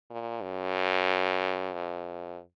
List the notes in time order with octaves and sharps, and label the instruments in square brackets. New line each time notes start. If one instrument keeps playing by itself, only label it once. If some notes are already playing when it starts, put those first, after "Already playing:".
[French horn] A#2
F#2
F2